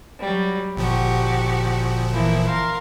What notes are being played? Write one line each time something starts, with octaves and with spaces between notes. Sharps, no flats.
F#3 G3
G1 A#2 F3 F#4 G4
E3 A#3 E4
A#4 F5 C6